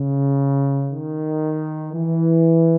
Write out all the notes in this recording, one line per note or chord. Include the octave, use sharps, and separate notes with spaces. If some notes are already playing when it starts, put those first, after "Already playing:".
Already playing: C#3
D#3
E3